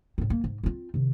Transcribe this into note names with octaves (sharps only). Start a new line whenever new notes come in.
A2 C4
A#3
G#2
C4 F4
C3 D#3